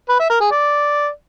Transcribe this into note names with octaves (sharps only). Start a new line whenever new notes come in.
B4
E5
A#4
G#4
D5